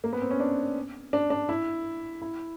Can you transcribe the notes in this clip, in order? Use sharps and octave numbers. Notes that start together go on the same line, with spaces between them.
A#3
B3
C4
C#4
D4
D4
D4
E4
E4